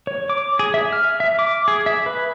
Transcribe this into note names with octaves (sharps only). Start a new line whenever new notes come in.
C#5
D6
G#4
E5
F6
E5
D6
G#4
E5
B4